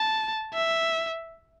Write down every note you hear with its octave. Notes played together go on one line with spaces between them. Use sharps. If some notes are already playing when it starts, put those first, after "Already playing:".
Already playing: A5
E5